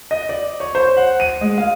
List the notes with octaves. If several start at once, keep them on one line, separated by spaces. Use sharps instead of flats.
D#5
D5
C#5
C5
F#5
D#7
G#3
F5